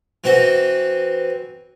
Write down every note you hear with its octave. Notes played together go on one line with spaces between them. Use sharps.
E3 C4 F#4